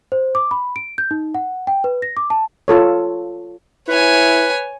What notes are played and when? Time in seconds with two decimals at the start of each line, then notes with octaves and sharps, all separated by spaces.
0.12 C5
0.35 D6
0.51 B5
0.76 D7
0.98 G6
1.11 D#4
1.34 F#5
1.67 G5
1.84 B4
2.02 A#6
2.17 D6
2.30 A5
2.68 F4 A4 C#5
3.88 E4 B4 C#5 G#5